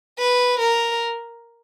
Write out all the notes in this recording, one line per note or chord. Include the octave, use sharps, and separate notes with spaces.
B4
A#4